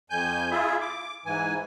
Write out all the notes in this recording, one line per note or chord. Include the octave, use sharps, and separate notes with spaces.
F2 G#5 G6
E4 F4 G#4 E5
D6
G#2 E3 G#5